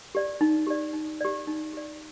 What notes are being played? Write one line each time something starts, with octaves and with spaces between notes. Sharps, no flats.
G4 D5
D#4
G4 D5
D#4
G4 D5
D#4
G4 D5